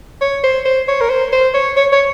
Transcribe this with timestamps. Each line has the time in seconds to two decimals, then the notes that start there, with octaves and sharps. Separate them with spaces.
0.21 C#5
0.43 C5
0.65 C5
0.88 C#5
1.01 A#4
1.10 C5
1.32 C5
1.54 C#5
1.76 C#5
1.92 C#5